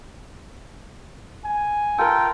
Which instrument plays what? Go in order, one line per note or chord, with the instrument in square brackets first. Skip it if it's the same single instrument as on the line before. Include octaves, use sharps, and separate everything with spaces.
[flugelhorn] G#5
[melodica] F4 G5 [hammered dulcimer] A4 A#4